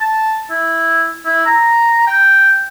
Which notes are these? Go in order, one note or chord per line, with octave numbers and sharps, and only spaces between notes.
A5
E4
E4
A#5
G5